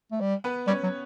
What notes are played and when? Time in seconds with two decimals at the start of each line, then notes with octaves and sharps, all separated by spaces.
0.12 A3
0.21 G3
0.44 B3 B4
0.67 G3 C#4 C#5
0.83 F#3